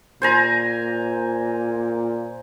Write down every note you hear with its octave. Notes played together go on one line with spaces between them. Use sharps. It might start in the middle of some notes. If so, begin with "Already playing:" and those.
A#2 C5 G#5 A#5